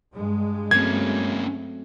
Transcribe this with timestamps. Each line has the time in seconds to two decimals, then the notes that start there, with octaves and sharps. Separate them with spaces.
0.14 G2 G#3
0.71 F#3 A3 A#3 C4 C#4 G#6